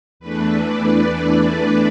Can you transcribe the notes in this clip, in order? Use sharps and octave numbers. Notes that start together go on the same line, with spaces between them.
E2 E3 A3 D4 B4
D5
D5
D5